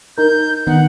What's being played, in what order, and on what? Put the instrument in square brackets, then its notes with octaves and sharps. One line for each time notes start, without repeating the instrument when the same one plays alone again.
[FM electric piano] D#4 A#4 [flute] G6
[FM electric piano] D#3 B3 D#4 [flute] F#5